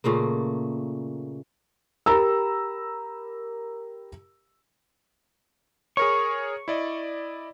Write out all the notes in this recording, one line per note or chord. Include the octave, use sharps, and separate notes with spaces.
A#2 C#3 A3 A#3
G4 A#4 A#5 B5 E6
G#4 A#4 C#5 C#6
E4 D5 D#5